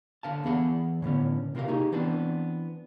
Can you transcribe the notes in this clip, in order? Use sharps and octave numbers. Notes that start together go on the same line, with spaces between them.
D3 F5 A5
E2 B3 G#4 F#5
A2 D3 B3 C#4
C3 A#3 E4 F4 A#4 F5
D#4 G4 G#4
E3 B3 C4 D4